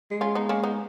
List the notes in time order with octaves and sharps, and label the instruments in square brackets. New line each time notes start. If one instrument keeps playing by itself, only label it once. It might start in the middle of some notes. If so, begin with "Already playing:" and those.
[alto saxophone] G#3
[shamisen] C#4 F4
B3 D#4
A#3 C#4
B3 D#4